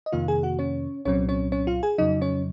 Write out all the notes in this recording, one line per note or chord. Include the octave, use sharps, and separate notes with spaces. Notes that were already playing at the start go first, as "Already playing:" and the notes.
D#5
F2 C3 D#3 A#3 F4 F5
G#4 G#5
F#4 F#5
C#4 C#5
C2 A#2 F#3 C4 C#4 C#5
C#4 C#5
C#4 C#5
F4 F5
G#4 G#5
F2 C#3 F#3 D#4 D#5
C#4 C#5